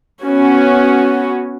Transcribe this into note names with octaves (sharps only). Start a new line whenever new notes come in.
B3 C#4 F#4